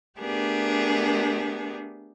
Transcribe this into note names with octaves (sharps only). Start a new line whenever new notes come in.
A3 B3 D4 G4 G#4 A#4